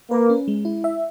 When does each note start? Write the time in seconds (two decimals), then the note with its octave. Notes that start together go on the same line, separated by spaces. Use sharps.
0.11 A#3 B4
0.30 C#4
0.48 G#3
0.65 E4
0.84 E5